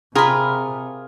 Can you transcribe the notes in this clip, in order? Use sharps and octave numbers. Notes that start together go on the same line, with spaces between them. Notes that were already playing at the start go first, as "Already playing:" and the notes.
C3 F4 G#4 A#4 A#5 B5